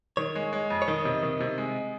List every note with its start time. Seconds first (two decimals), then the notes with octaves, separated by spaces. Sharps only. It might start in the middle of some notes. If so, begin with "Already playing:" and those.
0.17 D#3 C#5
0.36 G#3
0.53 G#3
0.70 F2
0.82 C#5
0.88 D#3 D#5
1.05 C3
1.23 D#3
1.40 C3
1.58 G#3